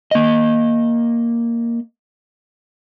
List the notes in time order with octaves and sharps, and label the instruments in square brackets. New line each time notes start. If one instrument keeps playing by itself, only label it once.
[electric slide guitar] A#3 D#5